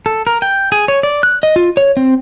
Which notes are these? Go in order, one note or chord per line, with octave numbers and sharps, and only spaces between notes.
A4
A#4
G5
G#4
C#5
D5
F#6
D#5
F4
C#5
C4